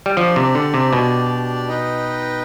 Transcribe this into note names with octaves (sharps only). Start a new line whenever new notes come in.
G3
F3 D4 G4 D5
C3
D3
C3
B2
D#4 B4 D#5 G5